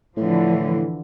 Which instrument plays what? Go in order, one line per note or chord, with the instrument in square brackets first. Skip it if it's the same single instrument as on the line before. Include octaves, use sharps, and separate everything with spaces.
[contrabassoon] A2 [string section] D3 E3 F3